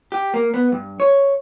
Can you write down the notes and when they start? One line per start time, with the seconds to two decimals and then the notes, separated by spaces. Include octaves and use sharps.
0.12 G4
0.34 A#3
0.54 B3
0.72 G2
1.00 C#5